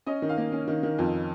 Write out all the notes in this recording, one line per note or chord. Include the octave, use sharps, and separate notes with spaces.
C#4 D#5
D#3
F5
A#3
C#4
D#3
D#3
F2